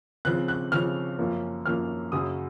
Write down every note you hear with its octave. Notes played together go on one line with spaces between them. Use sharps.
C#3 F3 C4 F#6
F#6
C#3 F3 C4 F6
F#2 F3 A#3 C#4
F#2 F3 A#3 C#4 F6
F#2 C#3 F#3 C#4 D#6